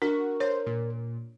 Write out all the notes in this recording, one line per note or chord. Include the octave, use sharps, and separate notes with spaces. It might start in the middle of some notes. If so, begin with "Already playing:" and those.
D4 F#4 A#4
C5 C#5
A#2